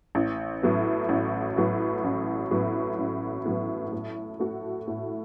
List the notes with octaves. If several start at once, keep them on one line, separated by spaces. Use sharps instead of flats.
A1
A2 F#3 B3
A1
A2 F#3 B3
A1
A2 F#3 B3
A1
A2 F#3 B3
A2
A3 F#4
A2